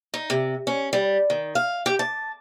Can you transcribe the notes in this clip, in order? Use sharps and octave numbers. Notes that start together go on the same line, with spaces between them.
D#4
C3
C#4
G3
D#3
F5
G4
A5